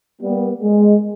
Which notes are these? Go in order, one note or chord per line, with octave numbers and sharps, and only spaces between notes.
G3 A#3 B3
G#3